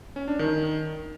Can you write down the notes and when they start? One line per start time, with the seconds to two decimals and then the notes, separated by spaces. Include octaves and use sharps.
0.16 C#4
0.28 D4
0.39 D#3